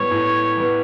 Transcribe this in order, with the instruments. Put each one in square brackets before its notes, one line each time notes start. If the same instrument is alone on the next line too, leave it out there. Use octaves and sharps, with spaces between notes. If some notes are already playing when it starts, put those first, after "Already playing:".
Already playing: [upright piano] A2 G3 B3 [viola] C#5
[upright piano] A2
G3 B3